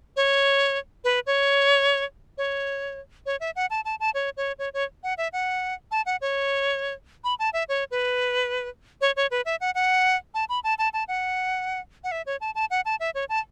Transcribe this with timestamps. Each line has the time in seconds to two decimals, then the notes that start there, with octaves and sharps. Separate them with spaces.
0.16 C#5
1.04 B4
1.27 C#5
2.38 C#5
3.26 C#5
3.40 E5
3.56 F#5
3.70 A5
3.85 A5
4.00 A5
4.14 C#5
4.37 C#5
4.59 C#5
4.74 C#5
5.03 F#5
5.18 E5
5.33 F#5
5.91 A5
6.06 F#5
6.21 C#5
7.24 B5
7.39 A5
7.53 E5
7.69 C#5
7.91 B4
9.01 C#5
9.16 C#5
9.31 B4
9.45 E5
9.61 F#5
9.75 F#5
10.34 A5
10.49 B5
10.64 A5
10.78 A5
10.94 A5
11.08 F#5
12.04 F#5
12.12 E5
12.26 C#5
12.41 A5
12.55 A5
12.71 F#5
12.85 A5
13.00 E5
13.15 C#5
13.29 A5